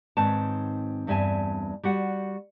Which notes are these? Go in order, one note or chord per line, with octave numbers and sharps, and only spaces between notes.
G#2 D#3 C4 B4 C#5 A5
E2 G2 C4 E5 G#5 A5
G3 F#4 F#5